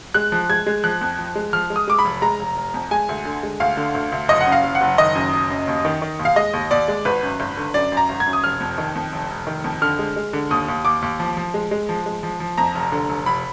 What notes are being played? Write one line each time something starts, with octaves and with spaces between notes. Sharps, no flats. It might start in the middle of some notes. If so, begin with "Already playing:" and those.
G#3 F#6
F3
G#3 G#6
G#3
F3 F#6
F2
F3
G#3
F3 F6
G#3
D#6
G#3 D6
B5
F1
G#3 A#5
F1
F1
F2
G#3 G#5
D2
D3
G#3
D2 F5
D3
D2
D2
F#1 D#5
F#5
F#2
F5
F#1
F#5
F#1
D#3 D#5
F#2
F#1
F#2
D#2
D#3
D#3
D#2
F5
G#3 D#5
D#2
D#2 D5
G#3
G#1 B4
F#2
G#1
D3
F#2 D5
F#2
A#5
G#1
G#6
F#2
D#6
F1 F6
F2
D#3
F2
F1
F1
D#3
F2
D3 F6
G#3
G#3
D3
D#2 D#6
D#2
D#2 D6
D#2
F3
F3
G#3
G#3
F3
G#3
F3
F3
F2 A#5
F1
D3
F1
F1 B5